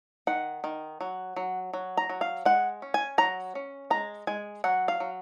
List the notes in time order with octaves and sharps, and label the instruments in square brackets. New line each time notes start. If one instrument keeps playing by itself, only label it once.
[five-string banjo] D#3 F#5
D#3
F#3
F#3
F#3
A#5
F#3
F5
G#3 F#5
C#4
G#5
F#3 A#5
C#4
G#3 A#5
G#3 G#5
F#3 F#5
F5
F#3